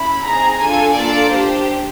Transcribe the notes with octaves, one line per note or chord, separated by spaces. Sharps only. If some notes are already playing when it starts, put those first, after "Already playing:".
Already playing: C#4 E4 B5
C4 D#4 G#4 A#5
D4 F4 A4 G#5
A#3 D4 F4 A4 D5
D4 G4 C5